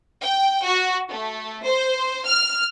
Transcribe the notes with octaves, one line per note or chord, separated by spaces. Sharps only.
G5
F#4
A3
C5
F6